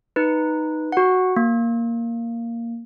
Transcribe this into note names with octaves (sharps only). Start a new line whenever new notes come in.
D#4 B4
F#4 F#5
A#3